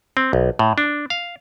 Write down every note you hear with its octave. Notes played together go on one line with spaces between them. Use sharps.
C4
B1
A2
D4
F5